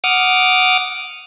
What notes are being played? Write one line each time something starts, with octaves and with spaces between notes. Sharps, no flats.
F#5 D6 D#6 F6